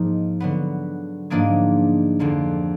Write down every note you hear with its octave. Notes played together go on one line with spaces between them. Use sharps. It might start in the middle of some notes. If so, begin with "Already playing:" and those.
Already playing: G#2 F3 A#3 D#4
D3 F#3 B3
G#2 F3 A#3 D4 G#4
F2 D3 F3 A#3